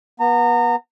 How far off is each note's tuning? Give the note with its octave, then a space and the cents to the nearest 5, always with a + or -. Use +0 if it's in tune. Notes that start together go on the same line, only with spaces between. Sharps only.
B3 -30 A#5 -30